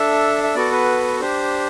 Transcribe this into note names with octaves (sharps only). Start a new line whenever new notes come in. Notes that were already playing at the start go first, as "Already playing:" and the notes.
Already playing: D4 A4 E5
E5
B3 F#4 A4 D5
B4
D4 G4 C5